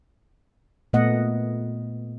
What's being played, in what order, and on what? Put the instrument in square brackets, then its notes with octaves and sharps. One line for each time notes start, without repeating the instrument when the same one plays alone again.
[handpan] A#2 A3 B3 D#5 F#5